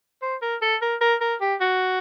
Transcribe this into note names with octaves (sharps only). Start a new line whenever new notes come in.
C5
A#4
A4
A#4
A#4
A#4
G4
F#4